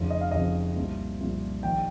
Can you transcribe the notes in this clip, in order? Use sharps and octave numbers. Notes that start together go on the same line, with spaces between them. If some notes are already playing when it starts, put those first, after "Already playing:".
Already playing: F1 F2 C#3 F3
D#5
F5
F1 F2 C#3 F3 D#5
C2 A#2 F3
C2 A#2 F3
A#1 D#3 G5